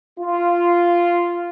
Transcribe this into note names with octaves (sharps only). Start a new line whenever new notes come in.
F4